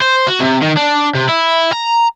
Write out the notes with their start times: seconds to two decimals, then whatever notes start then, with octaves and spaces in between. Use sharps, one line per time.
0.01 C5
0.27 F#4
0.40 C3
0.62 D#3
0.77 D4
1.15 C3
1.29 E4
1.72 A#5